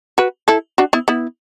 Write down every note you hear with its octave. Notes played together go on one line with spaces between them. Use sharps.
F#4 B4
E4 A4
D4 F#4
B3 E4
B3 E4